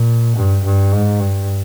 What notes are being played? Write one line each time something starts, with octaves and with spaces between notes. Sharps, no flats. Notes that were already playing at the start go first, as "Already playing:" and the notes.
Already playing: A#2
G2
G2
G#2
G2